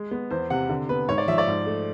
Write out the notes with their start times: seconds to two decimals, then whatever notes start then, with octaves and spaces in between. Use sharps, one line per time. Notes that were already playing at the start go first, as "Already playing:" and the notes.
Already playing: G#3
0.11 B3
0.31 E2 C5
0.50 C3 F#5
0.69 D3
0.89 B3 B4
1.08 G#2 C#5
1.18 D5
1.28 F3 E5
1.38 D5
1.48 G#2
1.66 A3